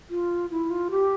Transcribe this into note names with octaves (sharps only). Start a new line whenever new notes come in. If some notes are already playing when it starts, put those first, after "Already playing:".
F4
E4
F4
G4